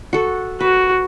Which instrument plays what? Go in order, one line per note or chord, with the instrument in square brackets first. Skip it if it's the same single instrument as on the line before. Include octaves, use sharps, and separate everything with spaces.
[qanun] F#4 A4
[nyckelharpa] F#4 [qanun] B4